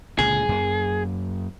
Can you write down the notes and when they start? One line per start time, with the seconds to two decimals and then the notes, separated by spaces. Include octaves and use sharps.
0.19 C#2 A#2 D3 G#4
0.49 F#2 A#3